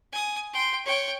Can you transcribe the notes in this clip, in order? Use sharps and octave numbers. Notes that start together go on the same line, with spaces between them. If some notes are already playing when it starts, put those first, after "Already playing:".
G#5 D#6
G5 C6
C#5 G5